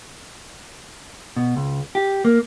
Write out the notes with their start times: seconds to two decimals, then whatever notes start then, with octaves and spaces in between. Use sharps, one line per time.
1.36 B2
1.56 C#2
1.95 G4
2.25 A#3